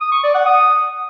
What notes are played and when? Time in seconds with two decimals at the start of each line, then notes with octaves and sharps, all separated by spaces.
0.01 D#6
0.12 C#6
0.23 D5
0.35 F#5
0.46 D#6